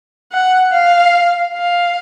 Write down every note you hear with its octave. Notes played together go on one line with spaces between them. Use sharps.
F#5
F5
F5